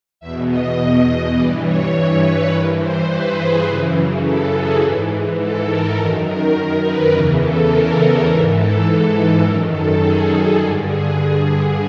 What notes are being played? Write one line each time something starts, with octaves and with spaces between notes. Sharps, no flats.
E2 B2 E5
D#5
D#5
G2 E3 D5
C#5
B4
G2 E3 A#4
C5
B4
G#4
F#2 C#3 E3
A4
G#4
G#2 E3
A4
A#4
F#2 D#3 A#4
A#4
B4
E2 C#3 E3 A#4
A4
A#4
A#4
G#2 E3 A#4
A4
F#2 D#3 A#4
A4
G#4
A4
G2 D3 G#4
G#4